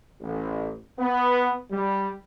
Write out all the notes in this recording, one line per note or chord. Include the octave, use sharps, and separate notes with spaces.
A1
B3
G3